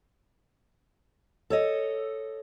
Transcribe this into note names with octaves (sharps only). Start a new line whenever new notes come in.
A4 C#5 D#5